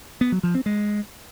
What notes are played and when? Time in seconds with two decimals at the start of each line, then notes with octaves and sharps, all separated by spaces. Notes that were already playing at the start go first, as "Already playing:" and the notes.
0.21 B3
0.32 F#3
0.43 F3
0.55 C4
0.66 G#3